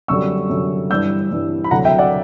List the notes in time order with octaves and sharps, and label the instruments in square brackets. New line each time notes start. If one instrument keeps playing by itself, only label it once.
[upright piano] F#2 D3 G3 C#6 E6
F#2 D3 G3
G2 E3 G3 E6 G6
G2 E3 G3
B5
D2 D3 F#3 F#5 A#5
E5 G5
D5 F#5